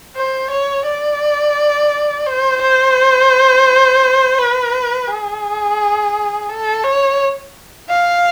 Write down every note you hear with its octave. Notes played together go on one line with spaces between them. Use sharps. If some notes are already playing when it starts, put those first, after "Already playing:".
C5
C#5
D5
C5
C5
B4
G#4
A4
C#5
F5